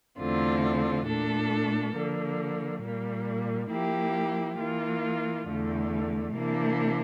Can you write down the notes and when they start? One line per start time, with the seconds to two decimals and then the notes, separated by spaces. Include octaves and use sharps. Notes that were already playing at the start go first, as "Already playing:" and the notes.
0.18 E2 D3 A3 C4 F4
1.05 A#2 A3 D4 A4
1.94 D3 F3 A#3
2.83 A#2 G3 A#3
3.71 F3 A#3 E4 G4
4.58 E3 A#3 F4
5.47 E2 D3 A3
6.35 C3 E3 A#3 D4